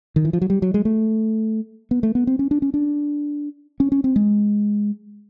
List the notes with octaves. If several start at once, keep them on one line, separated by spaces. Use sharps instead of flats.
D#3
E3
F3
F#3
G3
F#3
G#3
A3
B3
A3
B3
C4
C#4
D4
C#4
D4
C#4
C#4
C4
G#3